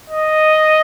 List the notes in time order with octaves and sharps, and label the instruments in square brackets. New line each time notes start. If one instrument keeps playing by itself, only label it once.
[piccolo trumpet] D#5